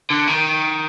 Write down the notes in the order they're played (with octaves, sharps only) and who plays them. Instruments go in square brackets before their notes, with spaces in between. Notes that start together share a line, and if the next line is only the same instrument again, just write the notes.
[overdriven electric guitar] D3
D#3